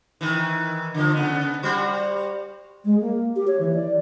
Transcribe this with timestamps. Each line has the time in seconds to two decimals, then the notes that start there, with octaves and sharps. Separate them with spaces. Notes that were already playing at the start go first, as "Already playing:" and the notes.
0.21 D#3 E3
0.94 D3 F3
1.14 C#3 B3
1.63 G3 F#4 C5
2.85 G#3
3.01 A#3
3.36 G4
3.47 C#5
3.60 E3
3.75 D5